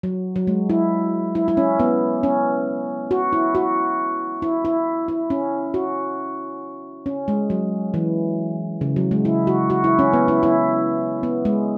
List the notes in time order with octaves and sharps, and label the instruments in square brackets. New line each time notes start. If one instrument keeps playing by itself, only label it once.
[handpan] F#3
F#3
G#3
E4
E4
E4
C#4
B3
C#4
F#4
E4
F#4
E4
E4
E4
C#4
F#4
C#4
G#3
F#3
E3
C#3
F#3
G#3
E4
F#4
F#4
E4
C#4
B3
E4
E4
B3
G#3